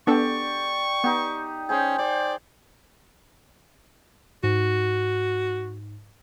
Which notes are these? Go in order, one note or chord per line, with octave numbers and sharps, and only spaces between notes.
B3 D4 G4 A4 D5 C#6
B3 D#4 G4
C#4 G#4 C5 G5
C5 D5
G#2 F#4